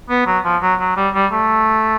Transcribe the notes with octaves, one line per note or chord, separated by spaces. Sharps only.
B3
F#3
F3
F#3
F#3
G3
G3
A3